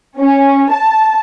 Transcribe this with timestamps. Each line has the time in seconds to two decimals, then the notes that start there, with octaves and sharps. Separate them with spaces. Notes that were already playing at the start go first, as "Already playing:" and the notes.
0.19 C#4
0.73 A5